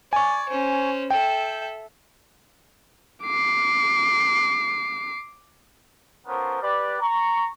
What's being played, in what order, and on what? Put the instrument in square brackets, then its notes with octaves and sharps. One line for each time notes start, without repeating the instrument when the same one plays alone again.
[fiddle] D5 [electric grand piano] G#5 C#6
[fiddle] C#4 C5
[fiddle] A4 E5 [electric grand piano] G5
[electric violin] D6 C7
[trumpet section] B3 C#4 F4 A4 A#4 C5
G4 B4 D5
A#5 C#6